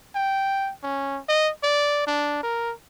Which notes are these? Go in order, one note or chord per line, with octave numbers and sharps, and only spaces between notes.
G5
C#4
D#5
D5
D4
A#4